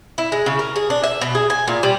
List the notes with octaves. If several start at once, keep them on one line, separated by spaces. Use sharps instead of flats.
E4
G#3
C#3
A#4
G#4
D4
E5
B2
G#4
G#5
A#2
G3